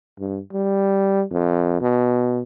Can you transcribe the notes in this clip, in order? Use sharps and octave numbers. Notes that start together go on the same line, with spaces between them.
G2
G3
F2
B2